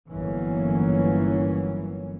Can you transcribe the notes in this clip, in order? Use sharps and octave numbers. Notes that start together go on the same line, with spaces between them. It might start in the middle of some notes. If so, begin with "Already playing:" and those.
G1 E3 F#3 A#3 C#4